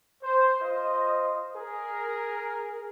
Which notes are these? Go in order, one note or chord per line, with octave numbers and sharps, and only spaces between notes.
C5
F4 C5 D#5
G#4 A#4